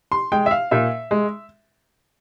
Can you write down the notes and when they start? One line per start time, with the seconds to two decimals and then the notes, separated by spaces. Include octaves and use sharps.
0.12 C6
0.32 G#3 G5
0.46 E5
0.51 F5
0.71 A#2 E5
1.11 G#3